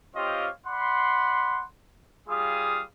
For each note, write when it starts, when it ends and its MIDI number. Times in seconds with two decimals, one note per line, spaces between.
0.15 0.49 60
0.15 0.49 65
0.15 0.49 67
0.15 0.49 73
0.15 0.49 75
0.15 0.49 77
0.66 1.63 74
0.66 1.63 78
0.66 1.63 83
0.66 1.63 84
2.28 2.82 55
2.28 2.82 65
2.28 2.82 68
2.28 2.82 77
2.28 2.82 87